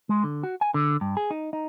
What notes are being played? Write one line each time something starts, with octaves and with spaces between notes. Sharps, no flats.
G#3
D3
F#4
G#5
D3
G2
G#4
D#4
D#4